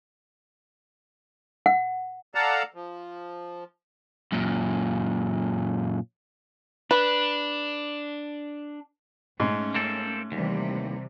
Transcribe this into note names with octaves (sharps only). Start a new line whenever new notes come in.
F#5
A4 D5 F5 F#5 A5 A#5
F3
F#2 A#2
D4 B4
G#2 A3 C#4
A#3 C4 A4
D#2 C3 E3 G3